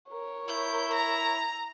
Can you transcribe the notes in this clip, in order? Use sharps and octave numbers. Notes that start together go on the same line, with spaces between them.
A#4 C#5
E4 G6
A#5